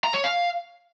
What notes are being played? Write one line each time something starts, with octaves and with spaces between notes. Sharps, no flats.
A#5
C#5
F5